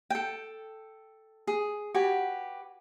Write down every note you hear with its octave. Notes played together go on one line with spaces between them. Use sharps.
A4 G5
G#4
F#4 G4 B4 G#5